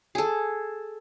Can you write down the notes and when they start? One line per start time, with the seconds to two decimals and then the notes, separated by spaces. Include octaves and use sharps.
0.15 G#4 A4